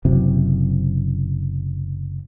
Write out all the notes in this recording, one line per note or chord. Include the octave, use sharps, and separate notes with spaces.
F#1 C3 F#3